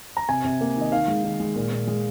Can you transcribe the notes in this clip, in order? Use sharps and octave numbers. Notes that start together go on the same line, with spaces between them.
A#5
C3 G#5
C3
A#3
D#3
D#5
D#3 F5
G#3
D#3
G#3
A#2
A#2
G#3